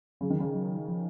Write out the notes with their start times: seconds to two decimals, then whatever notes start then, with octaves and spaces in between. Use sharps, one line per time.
0.21 C#3 F#3
0.30 D#3
0.40 C#3
0.55 F#3
0.88 F3